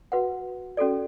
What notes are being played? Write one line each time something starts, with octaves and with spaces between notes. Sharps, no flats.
F#4 B4 F#5
C#4 F#4 A4 D5